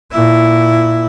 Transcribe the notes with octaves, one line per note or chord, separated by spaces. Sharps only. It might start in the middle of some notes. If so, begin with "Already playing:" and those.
A#2 E4